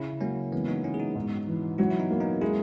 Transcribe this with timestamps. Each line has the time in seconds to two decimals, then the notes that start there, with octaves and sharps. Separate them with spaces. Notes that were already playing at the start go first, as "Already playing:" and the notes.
Already playing: C#3 C#4 E4
0.21 F#3 A#3 C#4
0.52 E3 G#3 B3
0.68 B3 D#4
0.83 B3 C#4 E4
0.94 G#4
0.99 D#4 F#4
1.15 G#2
1.47 E3
1.78 F#3 C#4 E4
1.91 E4
2.00 B3 D#4
2.11 A#3
2.20 B3 D#4
2.41 G#3 C#4 E4